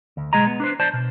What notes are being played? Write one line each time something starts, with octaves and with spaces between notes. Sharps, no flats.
D2
B1 G#3 G#4 D#5 A#5
B3
D4 B4 C5
C5 D5 A5
B2